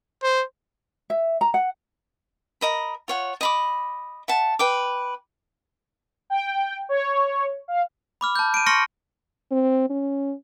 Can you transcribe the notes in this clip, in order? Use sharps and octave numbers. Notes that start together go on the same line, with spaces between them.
C5
E5
A#5
F#5
A#4 D#5 B5
F4 C#5 F#5
D#5 B5 D6
E5 F#5 A5
B4 G5 D6
G5
C#5
F5
B5 D6 F6
A5 G6
D7 D#7
C6 C#6 F6 A#6 C#7
C4
C#4